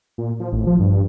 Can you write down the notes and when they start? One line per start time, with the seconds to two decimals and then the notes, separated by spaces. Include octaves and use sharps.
0.18 A#2
0.40 F3
0.52 A1
0.67 F3
0.80 G2